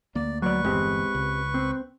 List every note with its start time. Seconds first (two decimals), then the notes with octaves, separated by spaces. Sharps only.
0.15 D2 A#3 D5
0.42 F#3 B4 D5 C#6
0.65 G1 E2 G#3 C4 G4
1.15 C#2
1.54 C4